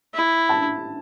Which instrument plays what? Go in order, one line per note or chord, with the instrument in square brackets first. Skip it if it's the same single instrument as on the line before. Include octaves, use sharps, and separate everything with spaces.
[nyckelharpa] E4
[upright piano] A5